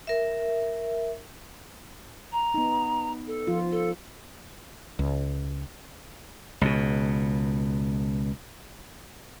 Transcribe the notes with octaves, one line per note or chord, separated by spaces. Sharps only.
A#4 E5
A#5
B3 D#4
A4
F3 F4
A4
C#2
C#2 B2